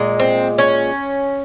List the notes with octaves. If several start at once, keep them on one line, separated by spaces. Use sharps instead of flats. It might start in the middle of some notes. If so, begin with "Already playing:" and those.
Already playing: A#2 G#3
C4
C#4